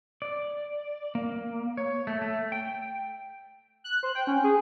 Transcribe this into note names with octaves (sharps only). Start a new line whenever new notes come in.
D5
A#3
C#5
A3
A3
G5
F#6
C5
G5
C#4
G#4